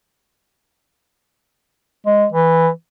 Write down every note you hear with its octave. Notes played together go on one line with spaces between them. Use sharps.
G#3
E3